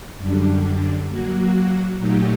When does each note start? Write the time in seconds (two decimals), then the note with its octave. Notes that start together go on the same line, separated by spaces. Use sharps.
0.18 F#2 D3 G3 D4
1.08 F#3 A#3 F#4
1.98 A#2 F#3 A3 D#4 G4